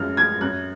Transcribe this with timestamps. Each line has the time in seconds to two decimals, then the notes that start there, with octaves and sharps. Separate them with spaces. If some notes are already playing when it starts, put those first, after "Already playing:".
Already playing: F#2 F3 G#3 F6
0.17 F3 G#3 G#6
0.41 F#2 F#6